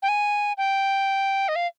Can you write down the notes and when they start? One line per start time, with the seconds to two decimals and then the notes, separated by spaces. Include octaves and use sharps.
0.02 G5
0.08 G#5
0.57 G5
1.48 D#5
1.56 F5